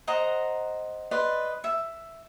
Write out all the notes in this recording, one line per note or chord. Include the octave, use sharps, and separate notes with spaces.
C5 D#5 F#5 A#5
B4 D5 D#5 C6
E5